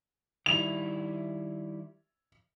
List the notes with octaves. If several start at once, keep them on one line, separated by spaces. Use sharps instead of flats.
D#3 G3 E4 F7